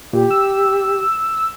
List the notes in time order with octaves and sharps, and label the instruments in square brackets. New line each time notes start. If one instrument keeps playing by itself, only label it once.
[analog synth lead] A#2 [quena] G4
[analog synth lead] E6